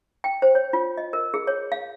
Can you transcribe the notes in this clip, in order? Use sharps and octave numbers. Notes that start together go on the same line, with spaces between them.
G5
C5
C#5
F4
D#5
A#4
G#4
C#5
F5